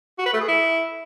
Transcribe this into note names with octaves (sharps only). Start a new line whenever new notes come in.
F#4
B4
A3
G#4
E4